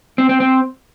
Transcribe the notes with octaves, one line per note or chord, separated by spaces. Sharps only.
C4
C4
C4